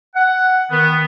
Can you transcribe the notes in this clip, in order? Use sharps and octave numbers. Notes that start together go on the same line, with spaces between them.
F#5
D#3 B3